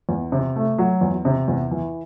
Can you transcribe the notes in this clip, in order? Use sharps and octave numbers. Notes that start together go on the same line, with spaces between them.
E2
C3
A3
F#3
E2
C3
E2
E3